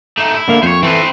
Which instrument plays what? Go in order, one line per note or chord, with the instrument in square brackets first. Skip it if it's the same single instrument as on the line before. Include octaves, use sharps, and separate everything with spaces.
[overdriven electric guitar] A3 D#4
E4
[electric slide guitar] D3 A#3 F5
[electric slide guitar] F2 [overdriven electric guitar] C5 C#5
[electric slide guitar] E3 A4 [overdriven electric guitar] C4 B4